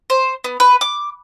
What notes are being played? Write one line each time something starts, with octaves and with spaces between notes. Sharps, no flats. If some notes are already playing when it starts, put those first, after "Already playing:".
C5
B3
B4
D6